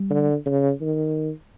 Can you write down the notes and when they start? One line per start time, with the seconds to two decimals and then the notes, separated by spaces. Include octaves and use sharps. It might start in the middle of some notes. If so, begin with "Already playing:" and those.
Already playing: G3
0.11 D3
0.46 C#3
0.81 D#3